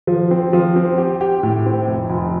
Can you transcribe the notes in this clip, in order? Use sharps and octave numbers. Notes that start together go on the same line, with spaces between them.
F3
C4
F3
C4
G4
G4
A2
C4
F1
F1